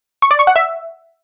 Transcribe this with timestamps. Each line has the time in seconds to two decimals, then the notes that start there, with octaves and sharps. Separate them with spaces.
0.22 C#6
0.31 D5
0.39 C#6
0.47 F#5
0.56 E5